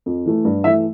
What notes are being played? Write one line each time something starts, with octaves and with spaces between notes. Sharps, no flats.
F2
E3 A3
G2
E3 A3 E5